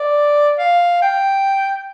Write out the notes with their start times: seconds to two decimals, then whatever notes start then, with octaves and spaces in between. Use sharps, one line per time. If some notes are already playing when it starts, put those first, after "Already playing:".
Already playing: D5
0.59 F5
1.02 G5